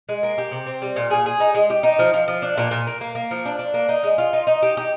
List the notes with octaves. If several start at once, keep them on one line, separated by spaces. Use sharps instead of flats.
G#3
A#3
G4
C3
C4
G3
A#2
G#4
G#4
D#4
G#3
G4
D#4
F3
F3
F3
D4
A#2
A#2
A#3
A#3
A#3
F3
D4
D4
A#3
D#4
G#3
F4
D#4
D#4
G4
G4